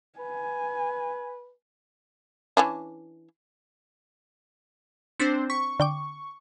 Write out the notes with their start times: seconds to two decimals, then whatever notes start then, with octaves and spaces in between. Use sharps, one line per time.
0.19 B4 G#5
2.57 E3 C#4 D4
5.19 C4 D4 C5 A6 B6 C#7
5.50 C#6 B6
5.80 D3 G5 D6